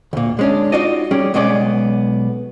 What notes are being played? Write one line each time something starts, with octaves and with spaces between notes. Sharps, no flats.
D2 A#2
G#3 C#4 D4
D#4 F4 F#4 D5 D#5
G3 C#4 G#4 D5
B1 G#3 B3 C#4 D5